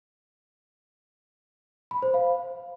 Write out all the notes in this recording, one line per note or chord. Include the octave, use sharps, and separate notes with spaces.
B5
C5
F5